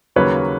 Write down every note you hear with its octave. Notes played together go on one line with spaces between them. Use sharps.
D#2 C#3 F#3 A#3 B4 C#5